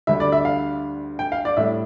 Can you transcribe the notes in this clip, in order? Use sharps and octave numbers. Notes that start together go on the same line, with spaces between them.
D2 D3 G3 E5
D5
E5
F5
G5
F5
D5
A2 G3 E5